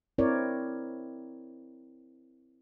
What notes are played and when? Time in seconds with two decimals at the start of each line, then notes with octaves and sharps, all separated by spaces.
0.18 C4 E4 A#4 C#5 D5